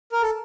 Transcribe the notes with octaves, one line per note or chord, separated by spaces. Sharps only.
A#4
A4